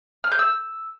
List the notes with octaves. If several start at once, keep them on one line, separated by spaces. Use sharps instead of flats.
F6
G6
E6